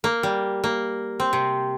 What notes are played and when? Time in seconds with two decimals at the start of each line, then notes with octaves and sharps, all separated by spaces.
0.04 A#3
0.23 G3
0.64 A#3
1.20 C4
1.33 C3